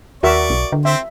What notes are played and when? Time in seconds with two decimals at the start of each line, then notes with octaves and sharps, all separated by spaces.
0.23 D#2 F#4 A#4 D5 E5 C#6
0.50 B1
0.72 D3
0.85 C4 C5 E5